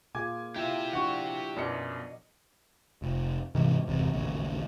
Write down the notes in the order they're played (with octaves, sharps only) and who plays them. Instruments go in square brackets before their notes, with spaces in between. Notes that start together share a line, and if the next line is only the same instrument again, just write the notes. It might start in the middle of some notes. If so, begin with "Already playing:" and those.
[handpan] A#2 F4 G#4 [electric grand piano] G#5 D6 G#6
[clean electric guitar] E4 [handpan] F4 [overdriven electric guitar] G4 E5
[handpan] F3 D4 F#4 [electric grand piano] F#5 C#6
[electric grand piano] F#2 B2 C#7 [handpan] D5 D#5
[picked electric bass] F1
G#2 C3 E3
G1 E2 C3
A1 D#2 A#2 C#3